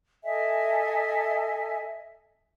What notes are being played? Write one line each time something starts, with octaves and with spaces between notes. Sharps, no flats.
A4 D#5 E5 G#5